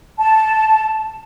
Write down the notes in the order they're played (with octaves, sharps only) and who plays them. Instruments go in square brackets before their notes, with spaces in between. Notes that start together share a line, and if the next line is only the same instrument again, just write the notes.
[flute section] A5